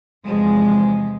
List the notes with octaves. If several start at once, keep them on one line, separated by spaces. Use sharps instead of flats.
E2 C3 F3 G#3